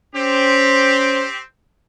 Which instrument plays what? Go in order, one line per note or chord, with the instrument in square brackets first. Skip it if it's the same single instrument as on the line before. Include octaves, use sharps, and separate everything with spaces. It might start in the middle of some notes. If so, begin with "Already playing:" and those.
[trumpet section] C4 G4 [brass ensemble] C#4 C5